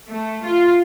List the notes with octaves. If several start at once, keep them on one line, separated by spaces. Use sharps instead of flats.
A3
F4